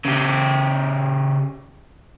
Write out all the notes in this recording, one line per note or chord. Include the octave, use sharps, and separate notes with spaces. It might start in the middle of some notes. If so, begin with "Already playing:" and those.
C#3 G4